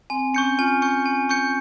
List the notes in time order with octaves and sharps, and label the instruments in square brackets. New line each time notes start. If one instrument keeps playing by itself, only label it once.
[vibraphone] C4 [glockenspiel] G#5
[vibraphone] C#4 [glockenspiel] C#6 G6 C#7
[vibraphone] F4 [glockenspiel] G#5
[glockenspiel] C#6 G6 C#7
G#5
C#6 G6 C#7